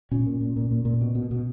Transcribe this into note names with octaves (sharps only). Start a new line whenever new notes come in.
A#2 C#4
A#2
A#2
A#2
A#2
A#2
B2
B2
B2